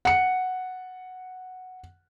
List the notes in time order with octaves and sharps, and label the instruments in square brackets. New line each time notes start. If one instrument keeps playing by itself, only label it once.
[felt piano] F#5 C#7